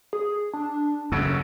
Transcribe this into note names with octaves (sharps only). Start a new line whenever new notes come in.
G#4
D4
F#2 C#3 A4